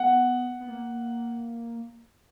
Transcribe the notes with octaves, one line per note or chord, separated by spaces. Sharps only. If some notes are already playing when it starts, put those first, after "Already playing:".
Already playing: B3 F#5
B3
A#3